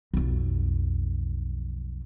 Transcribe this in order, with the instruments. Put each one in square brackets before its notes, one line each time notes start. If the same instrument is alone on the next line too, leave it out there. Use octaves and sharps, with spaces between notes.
[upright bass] B1 F2